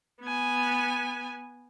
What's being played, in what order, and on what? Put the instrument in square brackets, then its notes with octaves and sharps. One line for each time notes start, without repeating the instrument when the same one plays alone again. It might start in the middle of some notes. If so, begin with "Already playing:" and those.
[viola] B3 G#5